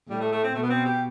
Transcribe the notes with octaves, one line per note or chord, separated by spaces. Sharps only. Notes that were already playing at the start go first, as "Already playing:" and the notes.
A2 G3
A3
A3
C4
B2 A3
B3
C4
G4